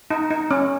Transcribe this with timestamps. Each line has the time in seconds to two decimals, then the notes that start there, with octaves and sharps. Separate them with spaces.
0.10 D#4
0.30 D#4
0.51 C#4